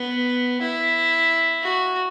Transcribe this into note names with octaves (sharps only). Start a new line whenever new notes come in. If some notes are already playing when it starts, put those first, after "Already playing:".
Already playing: B3
E4
F#4